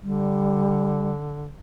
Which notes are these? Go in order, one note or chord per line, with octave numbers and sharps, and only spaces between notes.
D3 G3